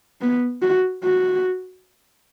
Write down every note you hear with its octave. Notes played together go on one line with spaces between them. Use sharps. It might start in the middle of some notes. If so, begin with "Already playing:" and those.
B3
F#4
F#4